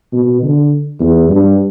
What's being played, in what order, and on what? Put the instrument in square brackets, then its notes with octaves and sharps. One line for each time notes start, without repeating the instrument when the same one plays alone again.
[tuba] B2
D3
E2
G2